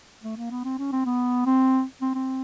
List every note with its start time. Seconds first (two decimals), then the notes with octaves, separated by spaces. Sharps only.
0.23 A3
0.37 A#3
0.51 B3
0.64 C4
0.78 C#4
0.92 C4
1.06 B3
1.46 C4
2.02 C4
2.15 C4